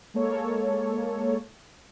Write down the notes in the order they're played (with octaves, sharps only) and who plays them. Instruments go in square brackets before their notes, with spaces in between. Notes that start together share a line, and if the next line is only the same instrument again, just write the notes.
[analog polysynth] G#3 A#3 A4 C#5